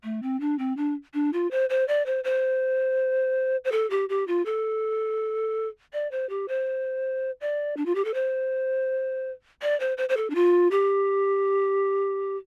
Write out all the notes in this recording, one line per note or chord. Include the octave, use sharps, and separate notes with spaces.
A3
C4
D4
C4
D4
D4
F4
C5
C5
D5
C5
C5
C5
A4
G4
G4
F4
A4
D5
C5
G4
C5
D5
D4
F4
G4
A4
C5
D5
C5
C5
C5
A4
D4
F4
G4